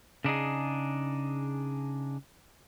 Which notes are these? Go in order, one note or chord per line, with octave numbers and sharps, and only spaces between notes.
C#3 D4 D#4 G#4